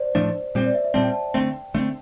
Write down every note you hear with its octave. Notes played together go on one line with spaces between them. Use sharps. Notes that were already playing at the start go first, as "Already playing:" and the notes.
Already playing: C5 D5
A2 F3 A3 D4
A#2 G3 C4 C5
D5
E5
E5
A#2 G3 C4 A5
G5
A5
D3 A3 C4 G5
D3 A3 C4